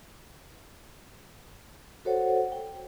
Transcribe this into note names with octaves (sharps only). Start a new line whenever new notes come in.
F#4 A4 C5 C#5 F#5
G5